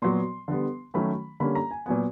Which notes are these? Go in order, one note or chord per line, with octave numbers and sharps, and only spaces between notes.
A#2 F#3 B3 C6
D3 G3 B3
D#3 F#3 A3 C#4 B5
D3 G3 A#3 C#4 B5
A#5
G#5
A#2 F#3 B3 G#5